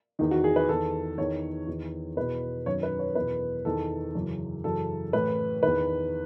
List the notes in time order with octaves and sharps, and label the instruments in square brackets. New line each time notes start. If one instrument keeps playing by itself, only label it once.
[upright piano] E2 D#3 D#4
F#4
G#4
B4
E2 D#3 A4
E2 D#3 C#5
E2 D#3
E2 B2 B4
F#2 D#3 C#5
B4
C#5
E2 B2 B4
E2 D#3 A4
F#2 C#3 E3
F#2 C#3 E3 A4
A2 E3 B4
E2 D#3 B4